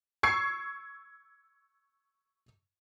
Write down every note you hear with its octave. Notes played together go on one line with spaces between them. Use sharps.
C#6 E6 G#6 C7 C#7